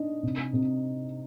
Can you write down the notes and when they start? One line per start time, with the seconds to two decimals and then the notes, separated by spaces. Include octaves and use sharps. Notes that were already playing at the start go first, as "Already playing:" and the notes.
Already playing: D4 D#4 D#5
0.23 C3
0.53 C3